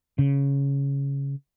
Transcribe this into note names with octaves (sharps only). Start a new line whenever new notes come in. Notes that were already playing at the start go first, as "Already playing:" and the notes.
C#3